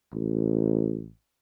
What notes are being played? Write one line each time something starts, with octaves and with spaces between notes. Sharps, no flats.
A1